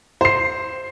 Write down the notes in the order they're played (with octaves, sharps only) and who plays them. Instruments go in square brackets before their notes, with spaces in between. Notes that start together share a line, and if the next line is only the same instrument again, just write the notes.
[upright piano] C5 C7